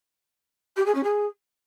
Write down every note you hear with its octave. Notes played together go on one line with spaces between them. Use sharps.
G4
G#4
C#4
G#4